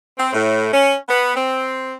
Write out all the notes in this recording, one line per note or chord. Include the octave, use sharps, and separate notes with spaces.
C4
A2
C#4
B3
C4